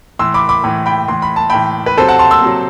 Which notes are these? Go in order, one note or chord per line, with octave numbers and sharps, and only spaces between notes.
A2 E3 C6 E6
B5 D6
B5 D6
A2 E3
G5 B5
A2 E3 C6
B5
A5
A2 E3 G5 B5
B4
C3 F#3 A4 C5
F#5 A5
A5 C6
C6 E6
C3 F#3